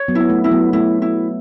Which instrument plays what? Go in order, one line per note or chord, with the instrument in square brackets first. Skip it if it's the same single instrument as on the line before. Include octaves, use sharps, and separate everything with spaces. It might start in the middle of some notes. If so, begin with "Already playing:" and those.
Already playing: [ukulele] C#5
[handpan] F#3 B3
[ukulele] E4
[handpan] B3
A3
[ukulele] E4
[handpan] F#3 B3
[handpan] A3 [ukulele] E4
[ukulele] E4